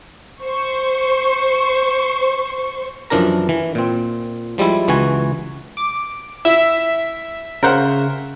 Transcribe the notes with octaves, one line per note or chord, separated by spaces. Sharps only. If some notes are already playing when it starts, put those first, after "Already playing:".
C5 C#6
F#2 E3 F3 D4 A#4 A#5
E3
A#2 C4
F3 G3 G#3 E4
C#2 E3 F#4 G#5
D6
E4 E5
C#3 A#4 C5 F#5